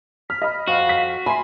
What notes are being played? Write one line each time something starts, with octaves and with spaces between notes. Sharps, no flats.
F6 B6
D#5 B5
F2 F#4 F5
B6
E5 G#5 B5 C6